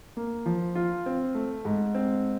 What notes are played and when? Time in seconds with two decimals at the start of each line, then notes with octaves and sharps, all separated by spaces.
0.17 A#3
0.46 F3
0.75 F4
1.06 C4
1.35 A3
1.65 G#2
1.95 C4